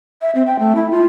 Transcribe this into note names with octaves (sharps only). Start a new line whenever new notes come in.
E5
C4
G5
A3
E4
F4